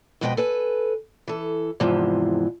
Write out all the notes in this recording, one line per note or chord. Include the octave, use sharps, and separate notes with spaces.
F2 B2 G#3 B4 D#5 G5
A4 B4 G#5
E3 A4
E2 G#2 C3 E3 F3